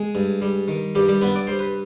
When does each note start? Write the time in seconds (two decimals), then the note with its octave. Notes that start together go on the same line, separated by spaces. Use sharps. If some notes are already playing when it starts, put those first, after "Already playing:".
Already playing: G#3 G#4
0.15 G2
0.42 G3
0.68 D#3
0.95 G2 G3 G4
1.08 G3 G4
1.22 G2 B3 B4
1.35 D5
1.47 G3 C5
1.59 B4